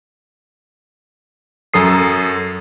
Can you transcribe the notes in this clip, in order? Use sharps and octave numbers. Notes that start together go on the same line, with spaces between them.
F#2 F#3 A4 D#6 C7